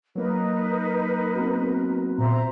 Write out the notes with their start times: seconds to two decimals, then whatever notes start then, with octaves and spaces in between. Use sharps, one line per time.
0.15 F#3 A#3 D#4 A#4 B4
1.35 B3 C4 F#4
2.18 A#2 C5 E5 A#5